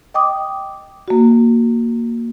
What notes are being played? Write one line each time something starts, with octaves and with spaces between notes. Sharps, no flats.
D#5 G5 D6 D#6
A#3 F#4